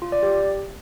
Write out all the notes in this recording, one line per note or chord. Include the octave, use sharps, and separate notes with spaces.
F4
D5
G4